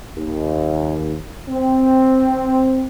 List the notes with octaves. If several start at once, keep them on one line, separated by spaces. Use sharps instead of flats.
D#2
C4